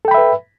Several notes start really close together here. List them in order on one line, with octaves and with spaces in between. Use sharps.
A4 G5 B5 E5 B4